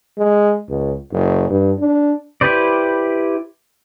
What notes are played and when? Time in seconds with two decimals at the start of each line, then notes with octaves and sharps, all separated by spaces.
0.18 G#3
0.69 C#2
1.11 F#1
1.50 G2
1.79 D4
2.41 E4 G4 B4 C5 D5